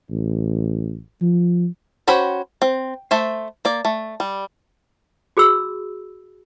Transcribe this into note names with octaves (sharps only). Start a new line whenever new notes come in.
A1
F3
C#4 F#4 C5 G5 B5
C4
A3 C5 E5
A#3 D5
A3
G3
F#4 G#4 B5 E6